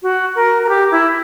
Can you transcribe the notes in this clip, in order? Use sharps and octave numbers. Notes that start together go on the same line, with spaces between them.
F#4
A#4
A#4
G4
E4